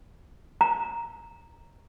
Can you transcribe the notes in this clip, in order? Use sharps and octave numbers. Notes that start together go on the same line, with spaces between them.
A#5